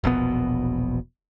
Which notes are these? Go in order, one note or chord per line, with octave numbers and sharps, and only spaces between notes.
E1 A#1 B2 B3